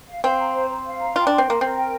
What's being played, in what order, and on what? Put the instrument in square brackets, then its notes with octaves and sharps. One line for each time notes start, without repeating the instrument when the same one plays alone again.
[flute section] F5
[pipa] C4 [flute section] F5
[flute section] A#5
C5
C5
F5
A#5
[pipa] F4 [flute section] G5
[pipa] D4 [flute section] C6
[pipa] C4
[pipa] A#3 [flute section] A#4
[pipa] C4 [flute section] A#4
[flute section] G5